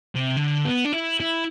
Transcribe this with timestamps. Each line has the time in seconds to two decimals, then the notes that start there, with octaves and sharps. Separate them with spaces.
0.15 C3
0.36 D3
0.64 B3
0.85 D4
0.93 E4
1.20 E4